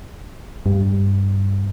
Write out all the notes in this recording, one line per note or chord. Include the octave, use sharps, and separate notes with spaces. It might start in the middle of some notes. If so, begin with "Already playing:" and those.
G2